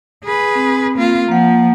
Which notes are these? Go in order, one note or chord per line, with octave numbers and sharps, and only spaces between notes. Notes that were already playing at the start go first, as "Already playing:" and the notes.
G#4 B4
C4
A#3 F4
F3 A#3 F#5